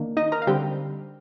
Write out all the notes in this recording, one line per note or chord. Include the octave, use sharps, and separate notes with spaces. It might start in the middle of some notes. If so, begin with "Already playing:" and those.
Already playing: D#3 A#3 D4
D#4 D#5
A#4 A#5
F5
D3 G3 C4 G4 G5